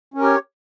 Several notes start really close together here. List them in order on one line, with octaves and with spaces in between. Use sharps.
C#4 A#4 G4 C#5